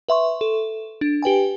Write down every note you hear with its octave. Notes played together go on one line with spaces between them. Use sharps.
B4 E5 C6 C#6
A4
D4
G4 B4 G5 G#5